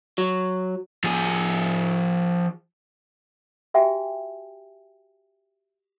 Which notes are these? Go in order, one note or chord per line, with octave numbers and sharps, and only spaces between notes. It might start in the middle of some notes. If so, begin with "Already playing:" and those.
F#3
F3 G#4
F#4 G4 E5 G5 G#5